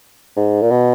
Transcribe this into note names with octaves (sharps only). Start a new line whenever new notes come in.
G#2
A#2
B2